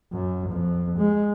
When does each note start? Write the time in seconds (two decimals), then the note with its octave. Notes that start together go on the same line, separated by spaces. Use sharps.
0.12 F#2
0.50 F2
0.98 G#3